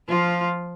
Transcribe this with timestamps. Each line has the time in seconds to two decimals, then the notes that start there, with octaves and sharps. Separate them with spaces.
0.08 F3 F4